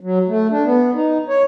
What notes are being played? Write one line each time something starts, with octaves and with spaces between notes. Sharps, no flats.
F#3
A3
D4
B3
D#4
C#5